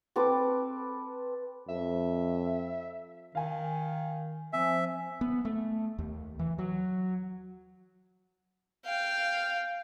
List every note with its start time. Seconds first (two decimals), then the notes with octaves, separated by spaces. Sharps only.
0.16 C4 A4 B4 D6
1.68 F2 E5
3.35 D#3 F5 G#5
4.53 F3 C4 E5 G#5
5.21 B3
5.45 A3
5.98 D#2
6.39 E3
6.58 F#3
8.86 F5 G5